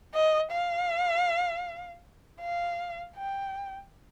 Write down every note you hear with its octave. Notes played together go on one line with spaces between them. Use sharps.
D#5
F5
F5
G5